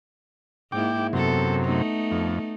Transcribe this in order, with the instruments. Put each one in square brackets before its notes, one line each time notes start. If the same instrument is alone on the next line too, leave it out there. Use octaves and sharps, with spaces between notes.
[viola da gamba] G#2 A#3 E4 [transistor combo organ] G5 D6
[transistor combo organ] F#2 C3 [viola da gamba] B3 A4
[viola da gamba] A3 B3 D#4
[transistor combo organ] F2